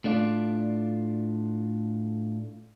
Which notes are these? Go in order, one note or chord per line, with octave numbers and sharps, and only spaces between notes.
A2 A3 D4 F4 D5